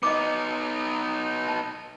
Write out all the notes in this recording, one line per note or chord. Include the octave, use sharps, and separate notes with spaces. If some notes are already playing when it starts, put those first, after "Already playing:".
B3 D#4 D#5 D6
A5